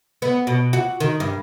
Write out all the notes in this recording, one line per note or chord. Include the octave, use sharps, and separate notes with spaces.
B3
B2
F#4
D#3
G2